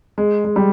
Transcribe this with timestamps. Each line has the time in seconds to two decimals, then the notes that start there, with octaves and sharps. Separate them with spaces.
0.18 G#3
0.45 G#3
0.56 G3